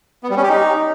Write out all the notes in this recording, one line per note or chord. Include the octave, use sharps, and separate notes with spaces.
B3
G3
C#4
G4
D#4